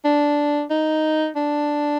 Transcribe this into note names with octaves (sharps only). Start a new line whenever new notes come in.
D4
D#4
D4